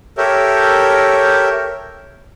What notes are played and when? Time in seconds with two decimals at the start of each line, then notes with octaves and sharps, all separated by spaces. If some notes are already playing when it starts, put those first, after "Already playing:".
0.18 G4 A4 A#4 C#5 E5